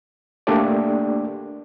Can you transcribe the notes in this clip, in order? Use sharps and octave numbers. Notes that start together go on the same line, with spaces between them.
A3 A#3 D4 G4 D5